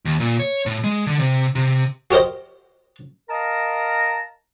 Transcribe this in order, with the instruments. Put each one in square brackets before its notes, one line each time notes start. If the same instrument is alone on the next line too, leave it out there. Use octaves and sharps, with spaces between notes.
[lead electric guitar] D#2
A#2
C#5
A2
G#3
D3
C3
C3
[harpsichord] F#4 G4 A#4 C5 D#5
[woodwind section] A#4 D#5 F5 A5 A#5